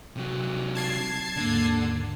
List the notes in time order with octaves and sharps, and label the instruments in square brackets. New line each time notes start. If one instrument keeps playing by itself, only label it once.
[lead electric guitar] C3 F#3
[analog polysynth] A5 G#6 C7
[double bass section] D#2 G#2 A#3 [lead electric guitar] D3